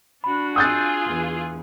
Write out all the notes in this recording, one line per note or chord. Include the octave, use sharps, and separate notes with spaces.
D4 F#4 B5
F4 G#4 D#6 E6 F#6 G6 A6
E2